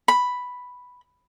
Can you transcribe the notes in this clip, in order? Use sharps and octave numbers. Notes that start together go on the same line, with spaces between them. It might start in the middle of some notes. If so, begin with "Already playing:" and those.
B5